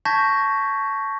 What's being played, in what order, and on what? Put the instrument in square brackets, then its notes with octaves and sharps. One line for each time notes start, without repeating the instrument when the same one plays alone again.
[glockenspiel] A5 C#6 G6 G#6 A#6 B6